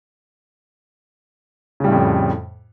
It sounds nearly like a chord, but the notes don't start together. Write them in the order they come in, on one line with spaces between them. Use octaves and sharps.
C#3 G3 A2 F2